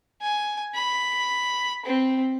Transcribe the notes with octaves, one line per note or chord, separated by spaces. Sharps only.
G#5
B5
C4